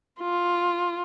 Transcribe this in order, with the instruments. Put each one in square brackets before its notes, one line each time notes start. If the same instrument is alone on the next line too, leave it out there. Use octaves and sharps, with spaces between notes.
[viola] F4